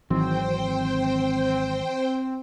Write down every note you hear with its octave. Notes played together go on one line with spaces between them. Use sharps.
G#1 D#3 E3 F#3 C4 C5 G5